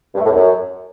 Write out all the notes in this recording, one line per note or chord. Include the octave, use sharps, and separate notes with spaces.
G2
A3
A2
E2
F#2